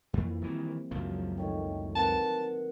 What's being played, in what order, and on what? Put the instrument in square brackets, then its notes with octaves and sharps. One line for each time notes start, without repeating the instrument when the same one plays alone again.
[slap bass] F2 [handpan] E3 F3 A#3
[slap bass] D#3 E3 [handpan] G3 C4
[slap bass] C#2 F#2 F3 [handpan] F#3 F5
[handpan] D#3 A3 C#5 [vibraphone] D#5 G5
[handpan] C4 F#5 [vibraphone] A#4 B4 [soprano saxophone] A5